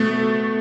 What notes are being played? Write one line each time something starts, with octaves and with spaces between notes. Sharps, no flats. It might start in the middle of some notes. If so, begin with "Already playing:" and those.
Already playing: B2 A3